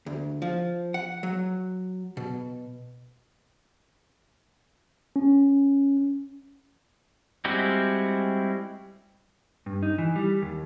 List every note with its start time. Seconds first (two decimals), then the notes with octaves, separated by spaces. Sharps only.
0.06 D2
0.42 F3
0.94 F#5
1.23 F#3
2.17 B2
5.16 C#4
7.45 G3 G#3 C4 E4 F#4
9.66 G2
9.83 D#4
9.98 E3
10.16 G3
10.42 D#2